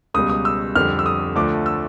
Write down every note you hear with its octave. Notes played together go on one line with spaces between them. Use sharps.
C#2 B2 G3 D#6
D#6
E6
F2 D3 G3 F6
E6
D#6
D2 D3 F3 A3 D6
E6